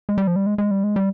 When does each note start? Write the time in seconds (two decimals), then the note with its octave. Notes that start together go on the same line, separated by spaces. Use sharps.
0.09 G#3
0.18 G3
0.27 F3
0.36 G3
0.46 G#3
0.58 G#3
0.71 G3
0.84 G#3
0.96 G3